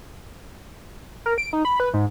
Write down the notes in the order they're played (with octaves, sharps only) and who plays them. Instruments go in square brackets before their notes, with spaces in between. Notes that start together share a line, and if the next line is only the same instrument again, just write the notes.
[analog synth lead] A#4
D7
D#4
B5
B4
G#2